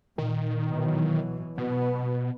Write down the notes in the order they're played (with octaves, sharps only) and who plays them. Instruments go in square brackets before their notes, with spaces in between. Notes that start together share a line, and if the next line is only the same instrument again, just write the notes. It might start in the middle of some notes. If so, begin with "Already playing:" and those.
[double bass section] A#2 [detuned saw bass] D#3
[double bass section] B2 E3 F#3
[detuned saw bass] B2 [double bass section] B3